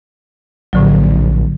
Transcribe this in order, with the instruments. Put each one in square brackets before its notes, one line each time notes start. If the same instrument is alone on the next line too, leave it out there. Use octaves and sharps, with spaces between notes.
[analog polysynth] A#1 [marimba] A2 D3 F#3